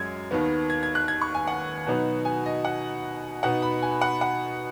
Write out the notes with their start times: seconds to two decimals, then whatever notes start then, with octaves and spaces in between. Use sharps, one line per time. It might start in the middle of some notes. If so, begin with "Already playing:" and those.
Already playing: F#2 G#3 G#6
0.31 D#2 D#3 B3
0.70 G#6
0.83 G#6
0.95 F#6
1.08 G#6
1.22 C#6
1.35 G#5
1.47 F#5
1.87 B2 F#3 B3 D#4
2.25 G#5
2.46 D#5
2.65 F#5
3.43 B2 B3 D#4 F#5
3.62 B5
3.82 G#5
4.01 F#5
4.21 F#5